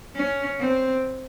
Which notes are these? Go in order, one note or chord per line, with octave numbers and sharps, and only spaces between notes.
C#4
C4